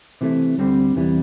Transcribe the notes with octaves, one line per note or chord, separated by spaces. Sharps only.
C3 E3 A3
D2 D3 G3 C4 G4
E2 C3 E3 G3